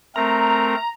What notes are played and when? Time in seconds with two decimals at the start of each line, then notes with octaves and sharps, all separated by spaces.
0.16 A3 C4 A#4 A#5